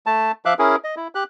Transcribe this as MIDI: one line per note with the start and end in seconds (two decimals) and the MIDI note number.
0.06 0.32 57
0.06 0.32 81
0.45 0.54 53
0.45 0.54 76
0.45 0.54 77
0.45 0.54 86
0.45 0.54 90
0.59 0.76 61
0.59 0.76 64
0.59 0.76 68
0.59 0.76 70
0.84 0.95 75
0.97 1.08 64
1.15 1.24 67
1.15 1.24 90